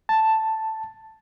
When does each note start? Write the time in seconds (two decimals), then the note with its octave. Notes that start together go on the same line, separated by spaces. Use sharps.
0.09 A5